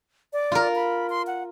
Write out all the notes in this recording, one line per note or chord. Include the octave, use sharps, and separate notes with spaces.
D5
F4 A#4
B5
C6
F#5